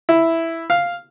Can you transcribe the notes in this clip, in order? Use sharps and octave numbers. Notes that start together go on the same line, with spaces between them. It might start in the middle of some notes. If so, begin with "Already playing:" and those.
E4
F5